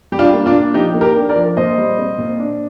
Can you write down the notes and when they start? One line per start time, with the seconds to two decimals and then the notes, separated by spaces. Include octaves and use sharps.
0.12 G3 G4
0.19 D4 F4
0.33 A#3
0.46 D4 F4
0.54 A#2
0.74 F3 D#4 G4
0.94 A#3
1.01 G4 A#4
1.16 D4
1.29 A#4 D5
1.36 F3
1.57 A#2 C5 D#5
1.78 G3
1.98 C4
2.18 A#2
2.39 D4